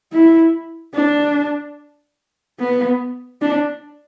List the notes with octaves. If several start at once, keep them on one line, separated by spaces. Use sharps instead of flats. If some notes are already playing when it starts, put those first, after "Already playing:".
E4
D4
B3
D4